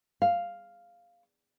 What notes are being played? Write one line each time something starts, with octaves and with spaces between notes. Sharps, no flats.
F5